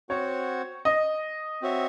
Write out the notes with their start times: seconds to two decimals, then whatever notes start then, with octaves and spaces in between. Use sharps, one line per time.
0.09 C4 F#4 C5 C#5 F#5
0.85 D#5
1.62 C4 F#4 C#5 E5